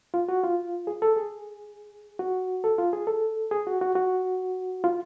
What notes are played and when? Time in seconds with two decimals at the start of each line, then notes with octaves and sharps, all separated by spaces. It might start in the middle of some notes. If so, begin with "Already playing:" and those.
0.14 F4
0.29 F#4
0.44 F4
0.87 G#4
1.02 A4
1.16 G#4
2.19 F#4
2.64 A4
2.78 F4
2.93 G#4
3.07 A4
3.51 G#4
3.67 F#4
3.81 F#4
3.95 F#4
4.84 F4